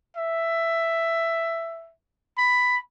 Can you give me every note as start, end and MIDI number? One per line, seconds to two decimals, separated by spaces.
0.17 1.92 76
2.38 2.78 83